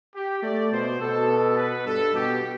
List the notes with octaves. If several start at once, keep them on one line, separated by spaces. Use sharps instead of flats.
G4
A3 D5
B2 C5
B2 A4
B4
G2 A4
B2 G4